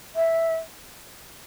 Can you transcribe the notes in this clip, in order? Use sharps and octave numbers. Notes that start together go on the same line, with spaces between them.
E5